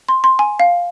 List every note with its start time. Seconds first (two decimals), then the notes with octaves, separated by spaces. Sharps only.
0.09 C6
0.24 C6
0.39 G#5
0.60 F5